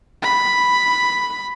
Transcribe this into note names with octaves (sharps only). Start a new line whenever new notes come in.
B5